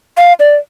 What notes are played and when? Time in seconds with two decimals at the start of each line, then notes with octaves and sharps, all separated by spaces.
0.17 F5
0.40 D5